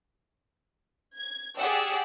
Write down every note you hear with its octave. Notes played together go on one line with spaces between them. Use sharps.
G#6
G4 G#4 D5 F#5 G5 E6